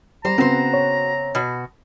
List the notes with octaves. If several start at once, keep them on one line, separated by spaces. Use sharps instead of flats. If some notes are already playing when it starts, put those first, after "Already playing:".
G3 C5 A#5
C#3 B3 C4 F#4 C5
C#5
B2 F#4